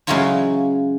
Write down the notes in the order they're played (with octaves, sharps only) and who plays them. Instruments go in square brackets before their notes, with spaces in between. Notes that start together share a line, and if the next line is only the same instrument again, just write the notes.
[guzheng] C#3 F#3 G#3 E4 F4 C#5